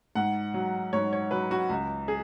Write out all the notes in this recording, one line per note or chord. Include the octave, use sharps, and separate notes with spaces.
G#2 F#5
F#3
G#2 C#5
C#5
F#3 B4
F#4
C#2
G#4